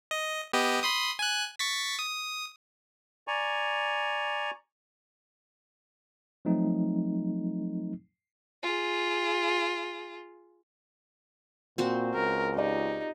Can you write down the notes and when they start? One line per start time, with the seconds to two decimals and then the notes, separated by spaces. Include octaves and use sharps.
0.11 D#5
0.53 B3 G4 D#5
0.83 B5 C6 D#6
1.19 G#5 F#6
1.59 C#6 A6 B6
1.99 D#6
3.27 D5 G#5 A#5 C#6
6.45 F3 F#3 A3 C4 D#4
8.63 F4 G#4
11.78 A#2 C4 F#4 C5
12.15 C#2 A#4
12.56 D#4 F4 G4 D5